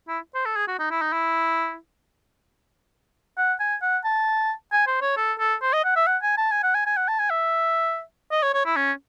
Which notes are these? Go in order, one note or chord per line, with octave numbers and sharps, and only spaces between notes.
E4
C5
A4
G#4
F#4
D#4
E4
D#4
E4
F#5
G#5
F#5
A5
G#5
C5
C#5
A4
A4
C5
D#5
F#5
E5
F#5
G#5
A5
G#5
F#5
G#5
G#5
F#5
A5
G#5
E5
D#5
C#5
C#5
E4
C#4